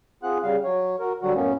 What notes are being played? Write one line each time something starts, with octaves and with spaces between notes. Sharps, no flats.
C4 F4 G#4 F#5 F#6
C#3 G3 F5
F#3 C#5
F#4 A#4
D3 F#3 G3 F#4
F#2 A2 A#3 B3 C#4